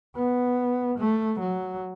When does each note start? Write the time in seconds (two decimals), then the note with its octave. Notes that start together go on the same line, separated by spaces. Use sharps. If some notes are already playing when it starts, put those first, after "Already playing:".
0.15 B3
0.99 A3
1.40 F#3